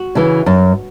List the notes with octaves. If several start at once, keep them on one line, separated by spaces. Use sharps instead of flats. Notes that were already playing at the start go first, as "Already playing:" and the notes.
Already playing: F#4
C#3 E3
F#2